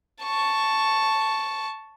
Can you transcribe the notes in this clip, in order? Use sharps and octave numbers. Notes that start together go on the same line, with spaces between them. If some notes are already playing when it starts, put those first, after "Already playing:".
A5 C#6